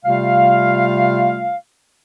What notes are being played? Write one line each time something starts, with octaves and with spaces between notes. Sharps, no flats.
C3 G3 A3 F4 F5